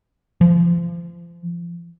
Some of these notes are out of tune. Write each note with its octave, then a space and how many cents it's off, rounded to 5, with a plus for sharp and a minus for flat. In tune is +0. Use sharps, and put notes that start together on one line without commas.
F3 -35